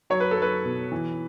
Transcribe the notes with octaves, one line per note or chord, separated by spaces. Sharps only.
F#3 C#5
B4
A4
F#3 B4
B2
E3